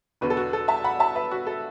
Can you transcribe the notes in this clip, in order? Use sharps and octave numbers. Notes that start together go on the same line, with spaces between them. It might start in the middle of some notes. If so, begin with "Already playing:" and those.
E1 E2 D3 B3 F#4 B4
A4
F#4
A4
E5 A5
F#5 B5
E5 A5
B4 E5
F#4
A4